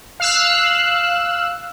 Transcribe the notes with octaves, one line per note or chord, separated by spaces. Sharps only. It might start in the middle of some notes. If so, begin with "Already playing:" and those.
F5 E6 F#6